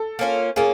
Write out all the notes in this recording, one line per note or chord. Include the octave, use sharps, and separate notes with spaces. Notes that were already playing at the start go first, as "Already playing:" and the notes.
Already playing: A4
A#3 C#4 F4
A#3 C#4 F4 G#4